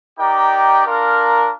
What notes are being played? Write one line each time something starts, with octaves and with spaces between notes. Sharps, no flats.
D#4 G4 A#4 D5 G5
D4 F4 A#4